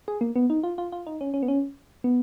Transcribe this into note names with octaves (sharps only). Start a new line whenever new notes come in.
G#4
A#3
B3
D#4
F4
F4
F4
D#4
C#4
C#4
B3
C#4
B3